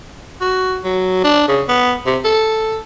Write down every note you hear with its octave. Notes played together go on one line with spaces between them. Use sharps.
F#4
F#3
D4
C#3
B3
C3
A4